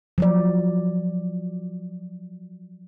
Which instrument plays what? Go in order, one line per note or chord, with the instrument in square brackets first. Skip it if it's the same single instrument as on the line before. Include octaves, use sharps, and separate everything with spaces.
[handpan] F3 F#3 D5